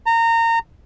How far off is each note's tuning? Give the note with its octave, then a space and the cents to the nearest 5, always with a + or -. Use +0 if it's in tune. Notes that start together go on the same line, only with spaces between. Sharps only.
A#5 -25